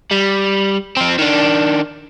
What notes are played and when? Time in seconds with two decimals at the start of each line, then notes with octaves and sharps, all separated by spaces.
0.11 G3
0.97 F3 C4
1.18 D#3 D4